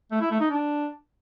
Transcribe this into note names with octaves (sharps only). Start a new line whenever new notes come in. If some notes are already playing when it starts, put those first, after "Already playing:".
A3
E4
A3
D#4
D4